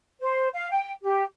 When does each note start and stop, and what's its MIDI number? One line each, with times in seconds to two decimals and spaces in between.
0.20 0.48 72
0.54 0.68 77
0.70 0.91 79
1.03 1.22 67